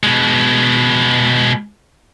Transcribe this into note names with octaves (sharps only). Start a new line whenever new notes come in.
B2 G#3